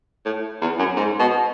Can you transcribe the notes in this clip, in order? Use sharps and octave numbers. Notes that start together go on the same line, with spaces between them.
A2
E2
F#2
G#2
B2